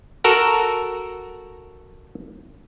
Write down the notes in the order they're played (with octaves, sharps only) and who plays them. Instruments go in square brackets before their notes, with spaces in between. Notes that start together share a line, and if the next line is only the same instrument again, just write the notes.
[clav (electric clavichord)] F#4 A4 A#4 F#5